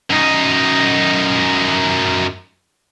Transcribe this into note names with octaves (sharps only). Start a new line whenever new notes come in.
F#2 D#4